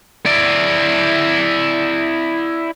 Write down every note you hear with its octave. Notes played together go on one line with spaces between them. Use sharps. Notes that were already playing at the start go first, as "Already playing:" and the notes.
E4 D5